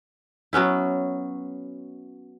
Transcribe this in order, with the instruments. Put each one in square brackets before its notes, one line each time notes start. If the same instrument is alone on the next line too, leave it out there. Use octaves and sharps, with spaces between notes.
[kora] F#3 B3 C#4 E4